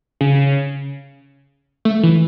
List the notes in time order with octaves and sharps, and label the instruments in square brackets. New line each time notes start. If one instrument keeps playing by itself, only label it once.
[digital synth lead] C#3
A3
E3